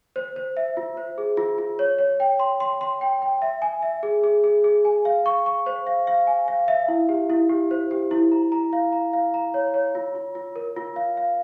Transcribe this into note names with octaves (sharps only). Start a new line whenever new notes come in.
C5
C5
E5
F4
C5
G#4
F4
F4
C#5
C#5
G5
C6
C6
C6
G5
G5
E5
G#5
E5
G#4
G#4
G#4
G#4
G#5
F5
C#6
C#6
C5
F5
F5
G#5
F5
E5
E4
G4
E4
G4
C5
G4
E4
A#5
A#5
F5
A#5
F5
A#5
C#5
C#5
F4
F4
F4
A#4
F4
F5
F5